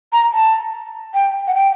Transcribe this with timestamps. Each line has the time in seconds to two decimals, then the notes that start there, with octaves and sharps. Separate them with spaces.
0.13 A#5
0.33 A5
1.14 G5
1.48 F#5
1.55 G5